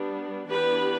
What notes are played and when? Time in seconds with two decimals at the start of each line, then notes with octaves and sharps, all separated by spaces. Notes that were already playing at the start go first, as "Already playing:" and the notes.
Already playing: G3 B3 D4
0.49 E3 B3 D4 G4 B4